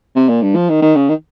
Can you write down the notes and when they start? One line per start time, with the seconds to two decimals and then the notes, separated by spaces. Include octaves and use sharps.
0.16 C3
0.29 A#2
0.42 G2
0.56 F3
0.70 D#3
0.82 D#3
0.96 C#3
1.09 D#3